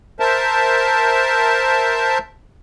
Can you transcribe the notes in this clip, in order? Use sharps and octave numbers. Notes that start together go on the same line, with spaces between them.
A#4 C5 E5 A5